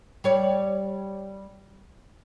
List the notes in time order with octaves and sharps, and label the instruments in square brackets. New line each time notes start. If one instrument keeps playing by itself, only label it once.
[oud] G3 C#5 D5